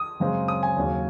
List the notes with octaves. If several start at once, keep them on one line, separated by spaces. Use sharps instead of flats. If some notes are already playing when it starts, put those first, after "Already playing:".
Already playing: D#6
F#2 C#3 G#3 C4
D#6
G#5
D#2 C#3 F#3